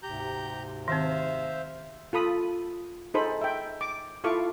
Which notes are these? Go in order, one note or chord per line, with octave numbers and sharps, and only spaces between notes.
D2 G#2 C3 G4 A#5 G6
D#3 C4 C5 E5 F5
F4 A4 B5 D#6
D#4 G#4 A4 C5 B5
E5 G5
D6
E4 F4 A4 F5 C#6 D6